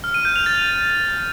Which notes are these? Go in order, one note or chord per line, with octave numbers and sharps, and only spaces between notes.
F6
D#7
G6
F7
A6